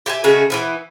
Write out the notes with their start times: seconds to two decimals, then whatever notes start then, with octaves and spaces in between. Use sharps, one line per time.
0.06 G4 E5 G5 G#5
0.24 C#3 G#3 A3 F#4
0.50 E3 F3 B3